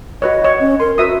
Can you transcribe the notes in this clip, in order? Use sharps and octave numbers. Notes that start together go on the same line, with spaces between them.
F#4 B4 C#5 D#5
F#4 C#5
C#4
A#4 C6
F#4 B4 E5 D#6